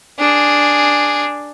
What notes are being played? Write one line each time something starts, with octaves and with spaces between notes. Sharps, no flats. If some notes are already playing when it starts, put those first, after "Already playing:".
D4 G#4